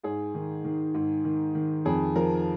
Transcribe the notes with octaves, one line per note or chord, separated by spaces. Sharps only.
G#2 G#4
D#3
D#3
G#2
D#3
D#3
F2 G#4
F3 A#4